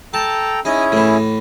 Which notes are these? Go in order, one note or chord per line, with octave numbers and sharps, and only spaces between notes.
A4 G5 A5 A#5
C#4 D#4 E4 G#4
A2 E3